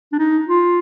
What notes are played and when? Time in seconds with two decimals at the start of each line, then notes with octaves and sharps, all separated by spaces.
0.12 D4
0.19 D#4
0.48 F4